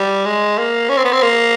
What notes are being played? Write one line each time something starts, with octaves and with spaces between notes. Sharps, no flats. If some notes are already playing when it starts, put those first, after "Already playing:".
Already playing: G3
G#3
A#3
C#4
C4
B3
C4
A#3